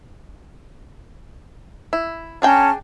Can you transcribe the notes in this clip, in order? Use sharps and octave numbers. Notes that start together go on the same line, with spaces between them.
E4
C#4 D4 G#4 G5 A5 A#5